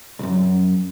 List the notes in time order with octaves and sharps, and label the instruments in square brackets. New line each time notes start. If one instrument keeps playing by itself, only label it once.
[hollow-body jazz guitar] B1 F#2